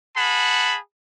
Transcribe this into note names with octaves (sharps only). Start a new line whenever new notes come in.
G#4 F#5 A5 B5